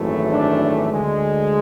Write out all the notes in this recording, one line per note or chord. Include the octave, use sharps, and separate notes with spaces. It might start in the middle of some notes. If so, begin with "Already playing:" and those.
Already playing: G#1 F#2 E3 A3
D4
D2 D3 G#3